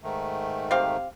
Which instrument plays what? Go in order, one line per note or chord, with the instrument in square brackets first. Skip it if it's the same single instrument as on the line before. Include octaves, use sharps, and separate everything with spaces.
[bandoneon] G#2 D#3 A3
[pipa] C4 G4 F5